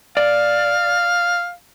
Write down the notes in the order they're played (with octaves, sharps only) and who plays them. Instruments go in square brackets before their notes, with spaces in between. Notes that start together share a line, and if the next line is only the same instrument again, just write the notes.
[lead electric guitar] D5 [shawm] F5